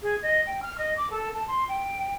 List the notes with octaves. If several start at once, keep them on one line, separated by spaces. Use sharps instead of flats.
G#4
D#5
G5
F6
D#5
D6
A4
A5
C6
G5